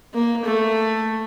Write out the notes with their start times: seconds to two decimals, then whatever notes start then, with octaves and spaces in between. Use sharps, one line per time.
0.14 A#3
0.45 A3